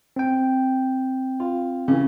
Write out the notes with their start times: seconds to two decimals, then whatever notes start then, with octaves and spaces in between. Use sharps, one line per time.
0.16 C4 G5
1.40 F4
1.88 C#3 E3